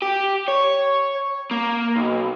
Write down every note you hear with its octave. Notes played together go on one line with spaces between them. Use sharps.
G4
C#5
A#3
B1